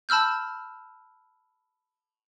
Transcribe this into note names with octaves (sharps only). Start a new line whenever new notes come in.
A5 B5 E6 F6 G6